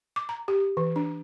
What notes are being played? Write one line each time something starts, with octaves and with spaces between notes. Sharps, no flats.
D6
A#5
G4
E3
D4